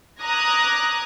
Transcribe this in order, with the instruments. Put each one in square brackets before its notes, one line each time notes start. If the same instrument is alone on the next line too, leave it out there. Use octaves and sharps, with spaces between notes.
[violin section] A#5 D6 D#6 F#6 G#6 A#6